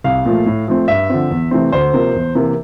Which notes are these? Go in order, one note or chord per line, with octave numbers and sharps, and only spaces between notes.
C2 F5
A#2 F3 A3
A2
F3 A3 C4
G2 E5
D3 F3 C4
E2
C3 E3 A3 C4
D2 C5
C3 F3 A#3
E2
C3 E3 A#3